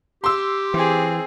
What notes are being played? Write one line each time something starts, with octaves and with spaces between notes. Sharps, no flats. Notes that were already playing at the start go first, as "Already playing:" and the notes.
G4 C6 E6
E3 C4 G#4